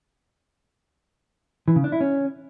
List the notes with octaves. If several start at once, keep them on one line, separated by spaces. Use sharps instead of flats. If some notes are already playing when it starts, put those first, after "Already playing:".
E3
C#3
D4
E4
C#4